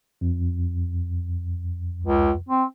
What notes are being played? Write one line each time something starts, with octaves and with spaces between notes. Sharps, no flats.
F2
C#2
C4